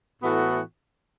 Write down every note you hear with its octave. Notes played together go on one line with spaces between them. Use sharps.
A2 E3 B3 F#4 A4